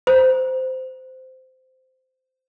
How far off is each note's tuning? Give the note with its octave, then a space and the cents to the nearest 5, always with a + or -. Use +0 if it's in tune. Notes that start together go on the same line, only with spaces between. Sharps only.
C5 -15